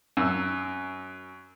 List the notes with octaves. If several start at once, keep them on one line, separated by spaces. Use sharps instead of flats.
F#2 E6